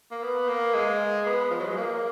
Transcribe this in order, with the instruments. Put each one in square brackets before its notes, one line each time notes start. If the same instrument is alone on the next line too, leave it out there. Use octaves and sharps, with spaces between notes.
[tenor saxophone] A#3
B3
A#3
G#3
B3
F3
F#3
G#3
A#3